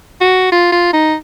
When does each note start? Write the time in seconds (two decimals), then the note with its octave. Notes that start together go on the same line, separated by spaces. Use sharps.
0.21 F#4
0.52 F4
0.72 F4
0.93 D#4